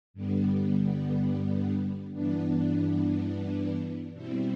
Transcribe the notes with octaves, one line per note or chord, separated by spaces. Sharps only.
G2 D3 G3 B3
G2 E3 B3 D4
B2 G3 C4 E4